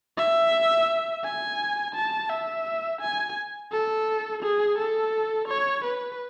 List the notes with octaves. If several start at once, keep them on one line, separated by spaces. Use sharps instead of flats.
E5
G#5
A5
E5
G#5
A4
G#4
A4
C#5
B4